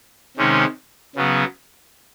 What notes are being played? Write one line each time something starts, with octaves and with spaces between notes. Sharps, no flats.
C3 D#3 G#3 C#4
C#3 F#3 B3